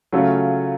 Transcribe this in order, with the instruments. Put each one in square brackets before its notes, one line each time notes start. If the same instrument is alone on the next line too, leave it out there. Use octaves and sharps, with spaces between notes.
[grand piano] C#3 F#3 A3 C#4 F4